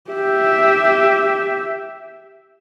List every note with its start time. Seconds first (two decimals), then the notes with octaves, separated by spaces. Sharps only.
0.11 G4 E5